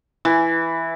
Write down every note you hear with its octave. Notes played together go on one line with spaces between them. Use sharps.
E3